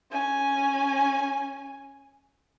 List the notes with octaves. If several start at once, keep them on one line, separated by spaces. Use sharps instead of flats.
C#4 G#5